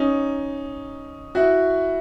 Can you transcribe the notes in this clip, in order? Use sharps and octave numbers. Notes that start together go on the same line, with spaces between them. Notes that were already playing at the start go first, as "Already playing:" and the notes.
Already playing: C#4 D#4
E4 F#4